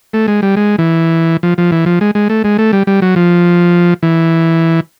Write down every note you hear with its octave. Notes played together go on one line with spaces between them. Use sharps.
A3
G#3
G3
G#3
E3
F3
F3
E3
F3
G#3
G#3
A3
G#3
A3
G3
G3
F#3
F3
E3